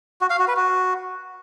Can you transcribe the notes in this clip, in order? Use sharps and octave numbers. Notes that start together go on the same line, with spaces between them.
F#4
F5
F#4
B4
F#4